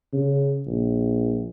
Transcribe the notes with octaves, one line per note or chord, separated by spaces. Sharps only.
C#3
A#1